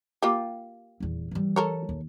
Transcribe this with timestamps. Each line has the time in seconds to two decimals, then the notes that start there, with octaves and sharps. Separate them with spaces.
0.22 A#3 F4 G4
1.00 D#1 E2
1.31 E3 G3
1.56 A4 A#4 C#5
1.89 D#2